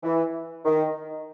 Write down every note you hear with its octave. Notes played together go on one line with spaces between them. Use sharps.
E3
D#3